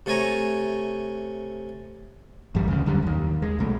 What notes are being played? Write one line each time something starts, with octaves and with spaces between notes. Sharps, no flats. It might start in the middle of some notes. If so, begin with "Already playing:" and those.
C3 A3 C#5 G#5 A#5
A1 F#2 G3
D2 C#3
F#2 D3 G3
D#2 D#3
G#3
B1 B2 A3